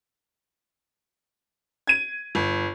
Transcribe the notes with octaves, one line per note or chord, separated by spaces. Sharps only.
G#6 D#7
G1